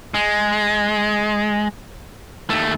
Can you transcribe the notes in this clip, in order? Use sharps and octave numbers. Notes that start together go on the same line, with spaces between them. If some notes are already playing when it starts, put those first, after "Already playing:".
G#3
D#2 A3